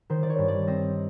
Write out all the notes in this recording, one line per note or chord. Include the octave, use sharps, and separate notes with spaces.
D#3 C5
D5
C#5
G2
D5
C4 D#5